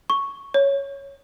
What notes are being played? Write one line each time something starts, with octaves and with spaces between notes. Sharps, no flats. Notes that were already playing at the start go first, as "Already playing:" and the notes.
C#6
C#5